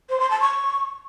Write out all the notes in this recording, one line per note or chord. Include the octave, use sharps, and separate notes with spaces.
C5
C6
A5
C#6